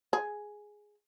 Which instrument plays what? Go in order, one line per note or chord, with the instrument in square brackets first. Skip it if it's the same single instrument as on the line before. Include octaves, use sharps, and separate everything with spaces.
[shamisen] G#4